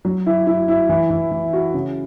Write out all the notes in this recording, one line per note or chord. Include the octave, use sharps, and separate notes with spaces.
F#3
E4
E4
E4
E3
E3
E3
F#4
C#3